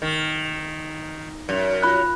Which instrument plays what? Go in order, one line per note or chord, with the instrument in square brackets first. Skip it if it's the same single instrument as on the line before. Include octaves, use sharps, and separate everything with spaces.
[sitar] D#3
F#2
[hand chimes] F4 B5 F#6